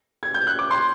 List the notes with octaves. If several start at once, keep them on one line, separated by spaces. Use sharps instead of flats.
G#6
G6
F#6
D6
C6